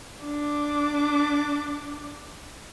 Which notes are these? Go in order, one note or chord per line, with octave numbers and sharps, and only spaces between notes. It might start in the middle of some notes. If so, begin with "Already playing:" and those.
D4 D6